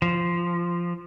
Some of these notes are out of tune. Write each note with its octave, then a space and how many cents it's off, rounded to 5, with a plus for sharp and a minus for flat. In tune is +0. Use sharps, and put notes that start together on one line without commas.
F3 -10